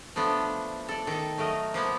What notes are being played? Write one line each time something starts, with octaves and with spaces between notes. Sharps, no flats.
F3 A3 B3 D4
A4 D5
D#3 A4
F#3 A3 A#4 D#5
F3 A#3 B3